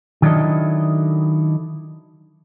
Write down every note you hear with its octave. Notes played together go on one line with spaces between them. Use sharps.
D#3 F#3 D4 E4 A4 D#5